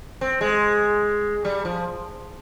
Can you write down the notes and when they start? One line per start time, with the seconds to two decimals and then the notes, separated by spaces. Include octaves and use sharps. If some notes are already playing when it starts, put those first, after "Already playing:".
0.21 C4
0.41 G#3
1.45 G3
1.65 F3